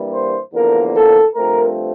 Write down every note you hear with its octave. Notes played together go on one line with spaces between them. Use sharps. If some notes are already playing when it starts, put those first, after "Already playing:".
Already playing: G2 E3 G3 A#3
C5
E2 D3 F3 A#3 A#4
A4
G2 F3 A3 C4 A#4